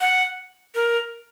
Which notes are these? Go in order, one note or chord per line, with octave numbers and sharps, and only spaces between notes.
F#5
A#4